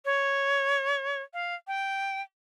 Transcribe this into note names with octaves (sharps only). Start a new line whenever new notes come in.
C#5
F5
G5